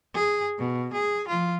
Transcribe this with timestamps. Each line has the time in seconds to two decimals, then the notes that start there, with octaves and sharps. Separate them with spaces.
0.14 G#4
0.58 B2
0.93 G#4
1.28 F3 F4